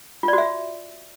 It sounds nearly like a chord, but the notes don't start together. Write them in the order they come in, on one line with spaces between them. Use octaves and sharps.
F4 D5 F#4 E5